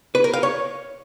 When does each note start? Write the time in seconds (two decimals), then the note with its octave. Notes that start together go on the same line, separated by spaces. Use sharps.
0.15 B4
0.24 A#4
0.33 F5
0.43 C#5